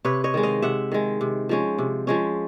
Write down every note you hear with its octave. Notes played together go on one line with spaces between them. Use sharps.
C3 B4 C#5
C#5 D#5
D#3 G#3
D#5 F5
C3 E5 F#5
D#3 G#3
C3
F3 G#3 C#4
C3
F3 G#3 C#4